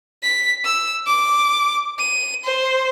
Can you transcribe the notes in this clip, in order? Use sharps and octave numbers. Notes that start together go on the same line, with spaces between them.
B6
E6
D6
D#7
C5